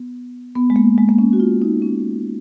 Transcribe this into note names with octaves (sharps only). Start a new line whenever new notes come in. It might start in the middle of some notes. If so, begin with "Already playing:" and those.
Already playing: B3
B3
G#3
A#3
G#3
A#3
C#4
F#4
F4
D#4
C#4